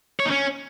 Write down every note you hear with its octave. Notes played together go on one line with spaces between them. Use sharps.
C#5
D#4
C#4